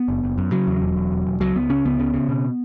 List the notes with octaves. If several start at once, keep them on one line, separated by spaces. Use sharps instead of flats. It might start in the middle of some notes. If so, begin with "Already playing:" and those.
Already playing: B3
F#1
F#1
F#2
C#3 F#3
E2
E1
E2
E1
E1
C#2 F#3
C#2 B3
C#3 C#4
C#2 B3
C#3
C#3
B2